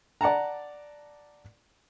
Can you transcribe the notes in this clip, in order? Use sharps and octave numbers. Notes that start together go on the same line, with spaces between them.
D5 F#5 A5 A#5